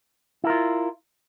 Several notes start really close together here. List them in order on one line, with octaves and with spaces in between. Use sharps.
E4 A#4 F4